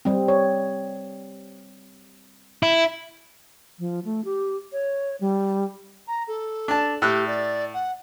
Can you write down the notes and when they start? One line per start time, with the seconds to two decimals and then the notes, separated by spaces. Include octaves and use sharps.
0.05 G3 C4
0.28 C#5
2.63 E4
3.79 F3
4.05 A3
4.25 G4
4.72 C#5
5.21 G3
6.07 A#5
6.27 A4
6.68 D4 A5
7.02 A2 G4 E6 F#6
7.27 D5
7.73 F#5